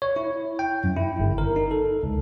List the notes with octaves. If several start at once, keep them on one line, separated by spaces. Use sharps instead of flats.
C#5
E4
G5
F#2
E4
G1
A#4
D#4
A4
C#2